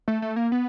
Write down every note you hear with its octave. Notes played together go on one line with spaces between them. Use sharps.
A3
A3
A#3
B3